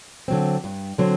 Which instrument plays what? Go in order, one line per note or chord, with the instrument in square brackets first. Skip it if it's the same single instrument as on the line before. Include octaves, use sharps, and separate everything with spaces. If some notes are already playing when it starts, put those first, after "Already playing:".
[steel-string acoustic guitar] D3 F#3 C4
G2
D3 F#3 C4